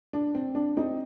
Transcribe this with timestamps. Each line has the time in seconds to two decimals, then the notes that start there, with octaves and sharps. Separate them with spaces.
0.13 D4
0.35 C4
0.55 D4
0.77 C4 D#4